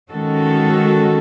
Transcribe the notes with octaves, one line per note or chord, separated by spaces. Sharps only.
D#3 G#3 C#4 F#4 A4